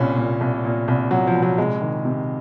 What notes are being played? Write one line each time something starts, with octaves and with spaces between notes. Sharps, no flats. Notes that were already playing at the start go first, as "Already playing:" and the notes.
Already playing: C2 A#2 C#4
A#2
C2
A#2
C2
A#2 F#3
F3
C2
F#3
C2 G#3
D#3
C3